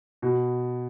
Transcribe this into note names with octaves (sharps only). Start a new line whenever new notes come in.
B2